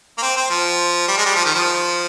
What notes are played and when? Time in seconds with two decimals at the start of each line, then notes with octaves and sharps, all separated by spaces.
0.18 A#3
0.22 C4
0.36 C4
0.50 F3
1.08 G3
1.17 G#3
1.26 G3
1.35 F3
1.45 D#3
1.54 F3